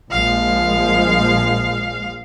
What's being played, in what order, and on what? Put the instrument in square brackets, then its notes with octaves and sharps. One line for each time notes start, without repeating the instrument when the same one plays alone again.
[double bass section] A#1 F3 G#3 [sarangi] F5